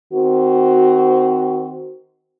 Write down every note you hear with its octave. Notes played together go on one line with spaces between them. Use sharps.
D#3 C4 F#4